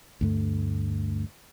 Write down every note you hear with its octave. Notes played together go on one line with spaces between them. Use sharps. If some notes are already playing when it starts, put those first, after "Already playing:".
D2 G2 A3